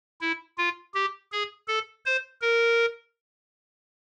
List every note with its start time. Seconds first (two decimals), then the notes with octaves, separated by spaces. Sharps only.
0.21 E4
0.58 F4
0.94 G4
1.32 G#4
1.68 A4
2.05 C5
2.41 A#4